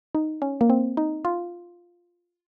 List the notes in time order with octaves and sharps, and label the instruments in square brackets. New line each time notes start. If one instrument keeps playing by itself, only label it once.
[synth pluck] D#4
C#4
A#3
C4
D#4
F4